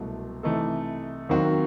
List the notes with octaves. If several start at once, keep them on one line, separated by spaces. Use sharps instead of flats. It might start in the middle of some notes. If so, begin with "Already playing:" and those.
Already playing: C2 B2 F#3 A3
C3 E3 A3 D#4 A4
D#2 D#3 F#3 C4 F#4